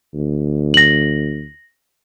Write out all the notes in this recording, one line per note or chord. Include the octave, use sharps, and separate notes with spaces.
D2
A#6 F#7